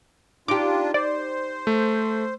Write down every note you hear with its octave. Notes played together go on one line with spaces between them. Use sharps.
D4 D#4 F4 G4 D6
C5 D5
A3